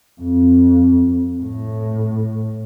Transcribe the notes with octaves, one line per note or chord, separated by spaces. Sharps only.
F2
A2